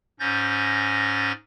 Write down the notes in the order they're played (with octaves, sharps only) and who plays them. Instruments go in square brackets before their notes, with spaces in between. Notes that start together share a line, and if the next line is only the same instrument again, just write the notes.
[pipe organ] G#2 C#4 G6 A6 A#6